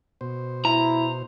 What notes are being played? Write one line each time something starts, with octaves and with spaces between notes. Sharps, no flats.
B2 C5
E4 A#5